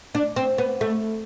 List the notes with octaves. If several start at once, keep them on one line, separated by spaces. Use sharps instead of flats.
D4
C4
B3
A3